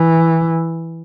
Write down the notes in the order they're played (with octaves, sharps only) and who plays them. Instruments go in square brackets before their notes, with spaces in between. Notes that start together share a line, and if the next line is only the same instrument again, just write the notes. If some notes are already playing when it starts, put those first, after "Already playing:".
Already playing: [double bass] E3